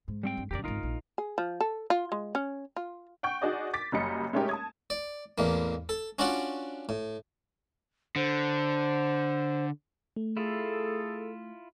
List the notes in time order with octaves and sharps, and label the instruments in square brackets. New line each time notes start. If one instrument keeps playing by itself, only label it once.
[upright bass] G#2
[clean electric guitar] G3 C4 G5
[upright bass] G2
[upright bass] F#2 D3 [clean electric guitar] G4 A#4 D5
[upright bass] G#1 C#2 [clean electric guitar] D#4 F4 A#4
[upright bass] A#1
[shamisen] G#4
F3
A4
F4
G#3
C#4
F4
[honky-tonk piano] F#5 G5 C#6 G6
D#4 F#4 G#4 D5 D#5
D6 A6 B6
F#1 F#2 G3 D#5 C#7
G#3 A3 C#4 D#4 G4 A#4
A5 D#6 G#6
[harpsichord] D5
A1 E2 A#3
A4
C#4 D4 F4 F#4 D5 F#5
A2
[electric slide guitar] D3 [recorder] C5
[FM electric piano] A3
[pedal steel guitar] E4 F4 [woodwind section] G#4 A4